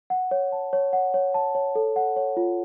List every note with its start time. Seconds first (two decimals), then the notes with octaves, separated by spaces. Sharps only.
0.10 F#5
0.31 C#5
0.52 A5
0.73 C#5
0.93 F#5
1.14 C#5
1.34 A5
1.55 C#5
1.75 A4
1.96 F#5
2.17 C#5
2.37 F4